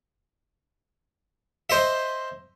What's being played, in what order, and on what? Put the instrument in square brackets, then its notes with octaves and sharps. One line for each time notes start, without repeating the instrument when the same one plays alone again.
[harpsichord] C5 D#5 E5